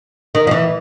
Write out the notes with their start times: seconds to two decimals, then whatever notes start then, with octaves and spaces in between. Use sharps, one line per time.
0.35 D#3
0.47 F3
0.51 E3